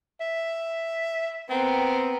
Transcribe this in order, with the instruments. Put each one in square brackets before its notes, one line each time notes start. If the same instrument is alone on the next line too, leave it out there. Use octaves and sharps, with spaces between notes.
[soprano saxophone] E5
[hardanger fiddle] B3 A#4 [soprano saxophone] C4